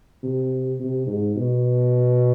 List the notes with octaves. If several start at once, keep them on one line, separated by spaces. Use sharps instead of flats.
C3
C3
G#2
B2